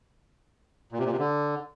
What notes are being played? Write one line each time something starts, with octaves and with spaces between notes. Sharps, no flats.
A#2
C3
A#2
C3
D3